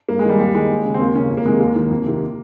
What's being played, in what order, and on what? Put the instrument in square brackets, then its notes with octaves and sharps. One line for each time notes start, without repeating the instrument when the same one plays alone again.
[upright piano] G2 A#3
G#3
D#3 G3
D#2 G3
D#3 G#3
D#2
C#3
C4
D#2 A#3
C#3 C#4
F2
A#3
C3 D#3 G#3
D#2 A#3
D#3
F2
C3 D#3